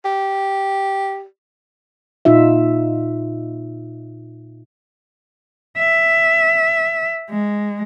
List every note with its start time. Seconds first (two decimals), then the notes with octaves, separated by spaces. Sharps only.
0.05 G4
2.25 A#2 D#4 F4 E5
5.78 E5
7.30 G#3